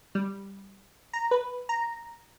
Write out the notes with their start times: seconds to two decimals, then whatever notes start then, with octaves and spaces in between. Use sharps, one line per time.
0.15 G3
1.13 A#5
1.31 B4
1.69 A#5